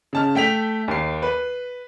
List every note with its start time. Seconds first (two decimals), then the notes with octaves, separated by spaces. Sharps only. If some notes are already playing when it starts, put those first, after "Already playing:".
0.13 C#3 A5 F6
0.35 A3 G5 B6 F7
0.88 D#2 C7
1.22 B4